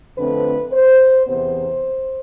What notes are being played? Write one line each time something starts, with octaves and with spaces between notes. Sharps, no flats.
F2 D3 A3 C4 B4
C5
E2 C3 E3 B3 C5